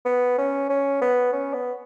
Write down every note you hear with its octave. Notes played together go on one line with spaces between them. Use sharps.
B3
C#4
C#4
B3
C#4
B3